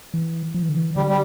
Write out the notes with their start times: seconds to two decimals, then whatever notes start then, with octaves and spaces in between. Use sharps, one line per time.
0.14 E3
0.54 F3
0.62 E3
0.69 D3
0.77 E3
0.96 D3 G3
1.08 G3